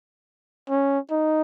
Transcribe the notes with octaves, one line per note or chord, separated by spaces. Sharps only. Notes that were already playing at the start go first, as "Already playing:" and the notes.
C#4
D#4